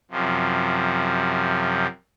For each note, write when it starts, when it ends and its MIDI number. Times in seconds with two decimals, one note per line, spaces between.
0.11 1.87 42
0.11 1.87 48
0.11 1.87 53